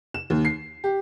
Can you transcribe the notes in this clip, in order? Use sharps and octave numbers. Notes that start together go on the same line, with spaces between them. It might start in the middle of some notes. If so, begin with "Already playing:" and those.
E7
D#2
C7
G4